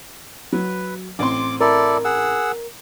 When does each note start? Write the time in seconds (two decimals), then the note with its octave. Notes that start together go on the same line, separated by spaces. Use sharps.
0.52 F#3 B4
1.19 A1 C4 C6 D6
1.61 E4 A4 A#4 D5
2.05 G#4 F#5 E6